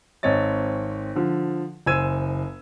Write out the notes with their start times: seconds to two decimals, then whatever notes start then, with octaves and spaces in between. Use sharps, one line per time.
0.23 G#1 C4 C#5 D#5 A6
1.15 D3 F3
1.86 F#1 C5 G#5 E6 G#6 D#7